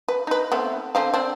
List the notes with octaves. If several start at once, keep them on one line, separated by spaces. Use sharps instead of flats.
B4
D#4 B4
A3 B3 C4
D3 C4 F5
C4 D4